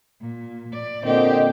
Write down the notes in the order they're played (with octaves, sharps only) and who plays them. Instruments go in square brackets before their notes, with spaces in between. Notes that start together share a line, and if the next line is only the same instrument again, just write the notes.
[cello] A#2
A#2 D5
[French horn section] A#2 D3 D#5 [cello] C4 G4